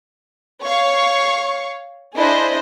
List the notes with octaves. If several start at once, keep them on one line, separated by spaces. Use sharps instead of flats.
C#5 F5 C#6
D4 E4 G#4 C5 D#5